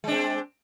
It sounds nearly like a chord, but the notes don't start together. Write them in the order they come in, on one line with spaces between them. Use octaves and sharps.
G#3 D4 C4